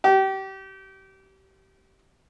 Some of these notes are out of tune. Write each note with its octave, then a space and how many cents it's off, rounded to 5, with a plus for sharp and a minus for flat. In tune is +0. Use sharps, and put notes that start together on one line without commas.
G4 -30